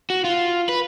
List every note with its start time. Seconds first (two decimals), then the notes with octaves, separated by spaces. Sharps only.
0.10 F#4
0.24 F4
0.69 B4